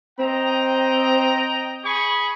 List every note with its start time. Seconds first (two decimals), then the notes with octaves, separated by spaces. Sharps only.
0.19 C4 D#5 G5 A#5
1.85 G#4 B5 C#6